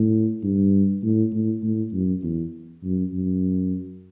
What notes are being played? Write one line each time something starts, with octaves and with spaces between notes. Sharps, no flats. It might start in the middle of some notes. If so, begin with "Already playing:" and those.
Already playing: A2
G2
A2
A2
A2
F#2
E2
F#2
F#2